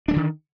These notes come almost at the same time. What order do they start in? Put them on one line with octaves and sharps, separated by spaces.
D4 G#3 D3 D#3